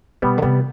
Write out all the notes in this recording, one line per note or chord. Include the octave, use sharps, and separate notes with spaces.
B2 G3 B3
D3
C3 G3 B3